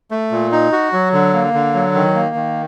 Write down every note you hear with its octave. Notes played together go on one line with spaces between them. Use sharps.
A3
A#2
D#4
F#4
F#3
D3
A#3
D3
F#3
D#3
A#3
D#3